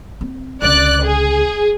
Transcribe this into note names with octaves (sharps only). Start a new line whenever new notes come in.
C4
C#2 D3 D5 F#6
G#4